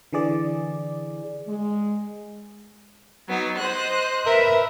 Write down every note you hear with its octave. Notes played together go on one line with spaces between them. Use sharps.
D3 E3 G#4 D5
G#3
F#3 B3 D#4
C5 D#5 F#6
A#4 B4 E5